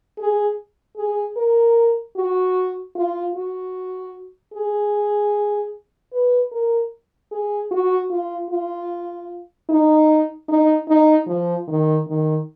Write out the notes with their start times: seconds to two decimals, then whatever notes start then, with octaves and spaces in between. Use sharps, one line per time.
0.19 G#4
0.97 G#4
1.36 A#4
2.16 F#4
2.96 F4
3.35 F#4
4.54 G#4
6.13 B4
6.52 A#4
7.31 G#4
7.71 F#4
8.10 F4
8.50 F4
9.69 D#4
10.48 D#4
10.88 D#4
11.27 F3
11.68 D#3
12.07 D#3